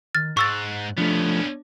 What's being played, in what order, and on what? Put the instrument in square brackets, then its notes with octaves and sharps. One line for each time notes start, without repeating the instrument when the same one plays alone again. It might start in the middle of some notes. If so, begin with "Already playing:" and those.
[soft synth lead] D#3 [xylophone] F6 A6
[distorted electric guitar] G#2 [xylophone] C#6 E6 A6 [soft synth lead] F#6
[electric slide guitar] F3 A3 [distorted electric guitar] B3 C#4 [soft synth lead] D4